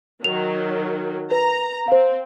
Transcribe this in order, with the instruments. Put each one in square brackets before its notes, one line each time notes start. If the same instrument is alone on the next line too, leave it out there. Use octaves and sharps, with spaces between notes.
[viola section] D#3 F#3 [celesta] F7
[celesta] B4 [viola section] A#5
[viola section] C4 [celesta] C5 F5